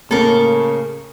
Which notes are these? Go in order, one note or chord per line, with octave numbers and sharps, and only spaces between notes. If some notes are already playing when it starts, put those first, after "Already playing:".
A2 C#3 A#3 A4 A#4